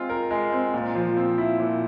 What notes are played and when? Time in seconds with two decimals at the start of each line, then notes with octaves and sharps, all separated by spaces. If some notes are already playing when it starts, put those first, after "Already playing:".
Already playing: G#3 C4 F4
0.09 A#4
0.31 G#3
0.52 C4
0.74 A#2
0.95 F3
1.16 C4
1.38 E4
1.60 A#2